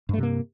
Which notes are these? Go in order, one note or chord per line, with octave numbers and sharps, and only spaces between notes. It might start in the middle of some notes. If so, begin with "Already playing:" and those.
G2 C3 A3 A#3